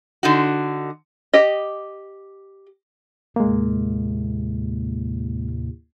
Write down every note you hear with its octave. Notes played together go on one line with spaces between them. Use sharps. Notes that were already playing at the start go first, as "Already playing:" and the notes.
D3 D#4 F#4
G4 D#5
D#2 A2 C3 G#3 A#3